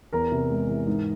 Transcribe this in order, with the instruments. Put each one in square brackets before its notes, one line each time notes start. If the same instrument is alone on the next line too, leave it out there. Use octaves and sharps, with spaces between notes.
[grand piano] E2 A#4 A#5
C3
G#3
E3
G#2